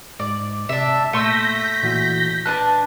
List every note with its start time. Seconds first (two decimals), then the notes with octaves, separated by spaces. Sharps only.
0.19 G#2 D5
0.69 C3 D4 E5
1.13 A#2 A3 C6 E6 G6 A#6 B6
1.83 A#2 E3 F#4
2.45 D4 B4 A5 F#6